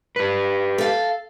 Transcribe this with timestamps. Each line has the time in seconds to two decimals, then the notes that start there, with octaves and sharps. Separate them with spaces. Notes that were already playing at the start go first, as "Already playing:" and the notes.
0.16 G4 B4
0.78 A4 F5